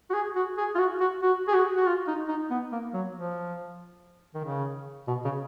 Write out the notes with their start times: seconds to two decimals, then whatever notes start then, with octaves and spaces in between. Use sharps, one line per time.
0.10 F#4
0.14 G#4
0.36 F#4
0.58 G#4
0.75 F4
0.78 F#4
1.00 F#4
1.22 F#4
1.48 G#4
1.54 F#4
1.76 F#4
1.86 F4
2.07 D#4
2.28 D#4
2.50 B3
2.72 A#3
2.94 F#3
3.15 F3
4.34 D#3
4.44 C#3
5.08 B2
5.24 C#3